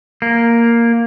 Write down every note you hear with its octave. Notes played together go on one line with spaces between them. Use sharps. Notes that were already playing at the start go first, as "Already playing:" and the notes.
A#3